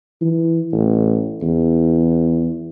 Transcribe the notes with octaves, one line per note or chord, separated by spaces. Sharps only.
E3
A1
E2